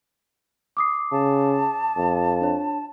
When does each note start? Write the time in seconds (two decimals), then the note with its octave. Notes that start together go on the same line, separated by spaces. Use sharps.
0.77 D6 D#6 C7
1.12 C#3 A5
1.97 F2
2.41 D4 C#5